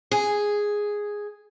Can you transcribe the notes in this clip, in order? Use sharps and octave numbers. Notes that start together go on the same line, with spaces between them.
G#4